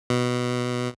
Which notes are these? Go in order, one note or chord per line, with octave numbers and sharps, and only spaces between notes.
B2